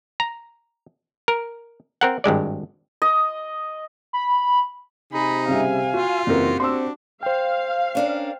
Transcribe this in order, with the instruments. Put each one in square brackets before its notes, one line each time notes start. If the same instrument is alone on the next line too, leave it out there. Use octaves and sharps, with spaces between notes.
[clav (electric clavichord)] A#5
A#4
C4 A#4 F#5
G#1 G2 G#3 D5
[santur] D#5
[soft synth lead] B5
[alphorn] C3 [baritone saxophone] D#4 [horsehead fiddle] G#4 B5
[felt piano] C#3 G3 E5 [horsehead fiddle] F5 G#5
[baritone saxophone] F4 [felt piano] F#4
[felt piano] F#1 C4 A#4 [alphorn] E3 [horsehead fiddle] F#4 G4
[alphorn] C4 [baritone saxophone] D4 [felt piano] C6 E6
[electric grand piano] C5 G5 [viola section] F5
[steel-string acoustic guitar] C#4 D4 A#4